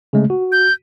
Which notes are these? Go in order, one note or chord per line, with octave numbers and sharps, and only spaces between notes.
C#3 G#3 A3
F#4
G6